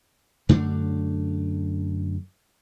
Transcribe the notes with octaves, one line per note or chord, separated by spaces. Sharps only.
F#2 D3 A3 D4